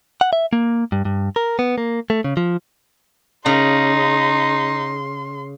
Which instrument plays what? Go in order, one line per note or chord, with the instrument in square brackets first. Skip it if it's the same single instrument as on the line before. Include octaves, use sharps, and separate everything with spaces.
[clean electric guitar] F#5
E5
A#3
G2
G2
A#4
B3
A#3
A3
C#3
F3
[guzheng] C#3 [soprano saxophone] D#4 [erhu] C6